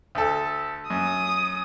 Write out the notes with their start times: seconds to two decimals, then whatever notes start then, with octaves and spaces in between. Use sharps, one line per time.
0.15 D2 A4
0.90 F#2 D#6